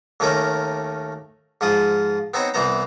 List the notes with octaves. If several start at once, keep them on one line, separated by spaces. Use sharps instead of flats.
D#2 D#3 A3 C#4 A#4 D6
G#2 F3 F4 D#6
B3 C4 D#4 C5 C#5
C2 E3 B3 C5 A#5